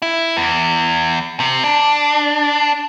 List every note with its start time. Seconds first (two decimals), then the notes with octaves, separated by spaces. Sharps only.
0.02 E4
0.37 E2
1.40 C3
1.64 D4